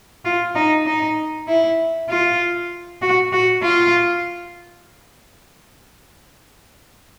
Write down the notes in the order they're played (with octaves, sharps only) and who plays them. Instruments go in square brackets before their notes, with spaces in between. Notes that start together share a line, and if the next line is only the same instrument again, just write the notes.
[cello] F4
D#4
D#4
E4
F4
F#4
F#4
F4